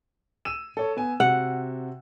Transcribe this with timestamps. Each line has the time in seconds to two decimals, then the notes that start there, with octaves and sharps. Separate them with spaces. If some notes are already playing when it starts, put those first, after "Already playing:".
0.45 E6 D#7 E7
0.77 A4 C#5
0.97 B3 G#5
1.20 C3 F#4 F#5